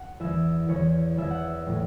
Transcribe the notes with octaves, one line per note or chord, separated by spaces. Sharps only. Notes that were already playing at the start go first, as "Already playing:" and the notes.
Already playing: F#5
E2 E3 E5
E2 E3 C#5
E2 E3 E5
F#5
E5
A2 E3